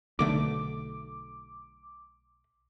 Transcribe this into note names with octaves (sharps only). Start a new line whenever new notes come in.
B1 D3 A3 D6